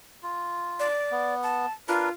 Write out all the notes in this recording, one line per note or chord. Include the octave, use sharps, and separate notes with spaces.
F4
D5
B3
A5
D4 F4 A#4 B4